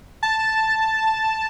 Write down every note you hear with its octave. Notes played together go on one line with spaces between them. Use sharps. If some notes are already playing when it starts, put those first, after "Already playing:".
A5